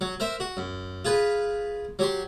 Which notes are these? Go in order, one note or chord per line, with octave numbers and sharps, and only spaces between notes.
F#3
A#4 C5 E5
F#4
F#2
F4 G#4 B4
F#3 G4 C6